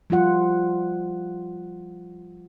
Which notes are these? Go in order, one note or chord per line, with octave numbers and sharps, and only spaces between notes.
F3 G3 F4 F#5